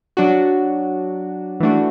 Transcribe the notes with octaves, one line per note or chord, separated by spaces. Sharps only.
F#3 D4 F#4
E3 A3 D4 F#4